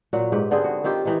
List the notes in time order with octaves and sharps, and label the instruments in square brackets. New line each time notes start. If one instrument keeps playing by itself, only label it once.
[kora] A#2 F#3 F#4
G#2 G4 B4
D3 B3 C4 G#4
F#4
D#3 C4 F4 G4
D#3 E3 D#4